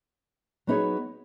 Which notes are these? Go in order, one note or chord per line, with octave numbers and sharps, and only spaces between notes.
F#3 B3 D#4 G#4 C#5